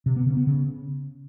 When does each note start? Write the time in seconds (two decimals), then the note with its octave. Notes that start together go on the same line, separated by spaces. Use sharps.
0.06 C3
0.16 B3
0.26 C#3
0.37 B3
0.47 C#3